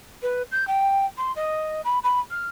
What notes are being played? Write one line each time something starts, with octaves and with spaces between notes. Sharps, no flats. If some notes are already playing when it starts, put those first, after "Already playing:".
B4
G6
G5
C6
D#5
B5
B5
F6